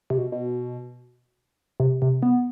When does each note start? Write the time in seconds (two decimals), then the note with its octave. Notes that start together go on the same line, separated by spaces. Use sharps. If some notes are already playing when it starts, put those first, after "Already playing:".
0.10 C3
0.18 B2
0.32 B2
1.80 C3
2.02 C3
2.23 B3